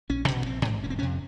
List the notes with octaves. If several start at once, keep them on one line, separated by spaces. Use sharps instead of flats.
A#1 C#4
A#2
C#4
A#1 C4
G#2
F1 C#4
C4
C#4
F2 C3